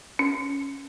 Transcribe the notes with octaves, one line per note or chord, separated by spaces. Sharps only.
C#4